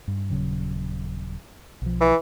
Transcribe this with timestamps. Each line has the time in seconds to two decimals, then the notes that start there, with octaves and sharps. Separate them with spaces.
0.08 G2
0.30 D#1 C#3 F#3
1.82 B1 F3
2.01 E3